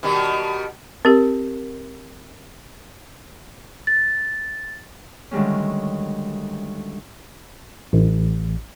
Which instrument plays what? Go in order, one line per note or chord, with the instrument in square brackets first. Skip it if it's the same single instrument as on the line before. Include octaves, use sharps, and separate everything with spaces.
[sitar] B2 D#3 G3
[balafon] C4 G4 [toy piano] A#4
[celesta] A6
[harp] D2 D#3 G3 G#3 C#4
[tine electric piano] A1